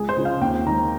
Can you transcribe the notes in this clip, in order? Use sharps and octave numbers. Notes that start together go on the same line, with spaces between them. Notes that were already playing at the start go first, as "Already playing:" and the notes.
Already playing: C#2 G#4
C5
C#3 F3 G#3
F5
D#2 G5
D#3 G#3 A#5